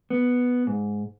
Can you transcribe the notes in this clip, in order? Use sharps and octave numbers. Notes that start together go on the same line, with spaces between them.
B3
G#2